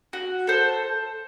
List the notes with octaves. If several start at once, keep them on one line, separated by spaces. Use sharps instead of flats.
F#4
A4 C5